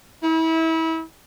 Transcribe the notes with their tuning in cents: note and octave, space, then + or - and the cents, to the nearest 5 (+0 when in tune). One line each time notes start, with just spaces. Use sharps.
E4 -30